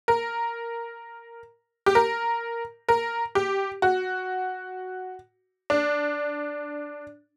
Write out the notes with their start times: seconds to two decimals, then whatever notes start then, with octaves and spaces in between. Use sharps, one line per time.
0.08 A#4
1.86 G4
1.95 A#4
2.89 A#4
3.35 G4
3.82 F#4
5.70 D4